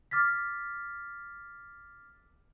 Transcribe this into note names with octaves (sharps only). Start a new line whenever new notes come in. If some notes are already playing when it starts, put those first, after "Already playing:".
D6 F6 A6 B6